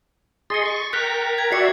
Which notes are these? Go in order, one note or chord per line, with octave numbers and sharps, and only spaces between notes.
G#4 D#5 C6 A6 C#7
C#6
A#4 G5 A#5 F#6 B6
G#6
F#4 D5 E5 C7 C#7